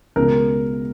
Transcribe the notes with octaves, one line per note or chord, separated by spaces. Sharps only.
C#2 B2 A#4